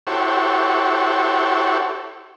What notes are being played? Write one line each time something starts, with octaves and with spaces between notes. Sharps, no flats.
E4 F#4 G4 A4 C5 C#5